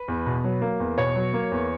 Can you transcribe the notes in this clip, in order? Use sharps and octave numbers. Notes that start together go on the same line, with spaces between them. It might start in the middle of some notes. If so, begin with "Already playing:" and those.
Already playing: B4
E2
B2
F#3
A#3
E2
B2 C#5
F#3
A#3
E2